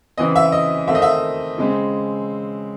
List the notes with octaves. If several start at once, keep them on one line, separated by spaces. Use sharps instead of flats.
C#3 E3 C4 D#5
E5
D#5
D#3 A3 C4 E5
D#5
E5
C#3 G#3 C4